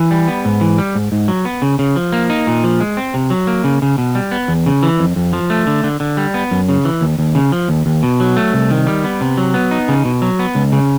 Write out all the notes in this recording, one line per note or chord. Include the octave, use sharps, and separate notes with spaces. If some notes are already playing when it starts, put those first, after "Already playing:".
Already playing: E3
G3
B3
G#2
E3
G3
G#2
G#2
F#3
B3
C#3
C#3
F3
A#3
D#4
A#2
F3
G#3
C4
C3
F#3
A#3
C#3
C#3
B2
G3
B3
E2
C#3
E3
F2
F2
F3
A3
D3
D3
D3
G3
B3
F#2
C#3
E3
D#2
D#2
C#3
F3
D#2
D#2
B2
F#3
A3
C2
D#3
G3
B3
C3
F#3
B3
D#4
C#3
B2
F#3
B3
C#2
C#3